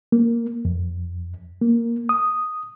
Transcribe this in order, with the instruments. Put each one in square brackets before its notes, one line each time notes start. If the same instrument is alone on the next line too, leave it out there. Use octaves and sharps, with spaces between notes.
[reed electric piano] A#3
F2
A#3
D#6